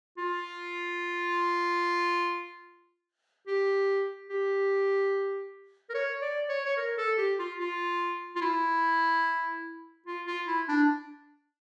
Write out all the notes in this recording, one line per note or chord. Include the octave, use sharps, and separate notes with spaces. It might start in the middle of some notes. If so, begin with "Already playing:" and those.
F4
G4
G4
A#4
C#5
D5
C#5
C#5
A#4
A4
G4
F4
F4
F4
E4
F4
F4
E4
D4